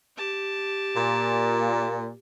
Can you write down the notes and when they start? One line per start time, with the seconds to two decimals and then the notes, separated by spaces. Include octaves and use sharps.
0.17 G4 A5
0.96 A#2